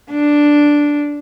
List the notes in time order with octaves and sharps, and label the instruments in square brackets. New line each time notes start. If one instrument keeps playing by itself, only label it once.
[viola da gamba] D4